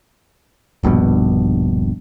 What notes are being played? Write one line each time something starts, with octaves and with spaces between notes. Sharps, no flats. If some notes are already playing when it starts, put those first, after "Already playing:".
D#1 A#1 G2 B2